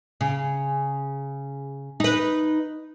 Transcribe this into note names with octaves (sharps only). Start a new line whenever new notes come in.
C#3
D#4 B4